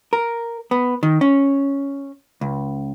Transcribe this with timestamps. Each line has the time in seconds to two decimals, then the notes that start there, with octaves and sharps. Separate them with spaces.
0.13 A#4
0.71 B3
1.03 D#3
1.21 C#4
2.41 C#2